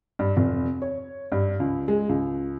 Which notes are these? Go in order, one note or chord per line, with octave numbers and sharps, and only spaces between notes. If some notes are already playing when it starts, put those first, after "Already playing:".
G2
F1
C#5
G2
C#2
G#3
C#2